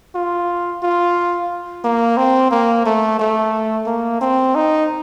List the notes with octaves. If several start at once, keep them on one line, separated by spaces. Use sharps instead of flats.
F4
F4
A#3
C4
A#3
A3
A3
A#3
C4
D#4